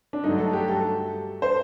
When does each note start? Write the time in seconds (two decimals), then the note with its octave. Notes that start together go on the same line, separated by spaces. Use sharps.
0.13 D4
0.24 G2 D3 F#3 A3 D#4
0.39 A4
0.53 G4
0.68 A4
1.42 C5